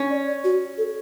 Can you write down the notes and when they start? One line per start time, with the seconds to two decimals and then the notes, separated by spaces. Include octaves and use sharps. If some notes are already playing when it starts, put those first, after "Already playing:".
Already playing: C#4
0.10 D5
0.28 D5
0.44 F#4
0.78 A4